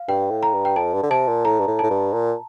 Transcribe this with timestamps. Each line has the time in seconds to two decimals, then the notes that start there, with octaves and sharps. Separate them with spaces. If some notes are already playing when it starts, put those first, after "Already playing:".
Already playing: F5
0.08 G2 G5
0.31 A2
0.43 A#5
0.54 G2
0.65 G5
0.76 F2 A5
0.94 G2
1.03 D3
1.10 C3 A5
1.28 A#2
1.45 A2 A#5
1.60 G2
1.67 A2
1.79 A2 A5
1.90 G2
2.13 A#2